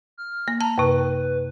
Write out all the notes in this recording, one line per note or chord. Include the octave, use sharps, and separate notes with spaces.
F6
A#3
A5 A#5
F#2 C3 B4